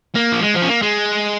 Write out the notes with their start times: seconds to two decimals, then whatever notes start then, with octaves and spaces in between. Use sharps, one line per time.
0.15 A#3
0.32 F3
0.42 G#3
0.55 F3
0.62 C#4
0.69 A#3
0.82 G#3